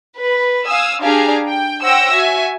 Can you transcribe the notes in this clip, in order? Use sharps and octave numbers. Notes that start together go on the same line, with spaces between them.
B4
F5 G#5 D#6 E6
D4 G4 G#4 F5 G#5 A#5
G5
C5 C#5 F#5 G5 E6 A#6
F#4 E5 G#5